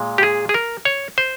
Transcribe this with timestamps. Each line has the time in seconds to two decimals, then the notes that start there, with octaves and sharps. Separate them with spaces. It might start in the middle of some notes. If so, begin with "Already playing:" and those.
Already playing: A#2 G#3
0.18 G4
0.23 G#4
0.49 G#4
0.54 A#4
0.85 C#5
1.18 C5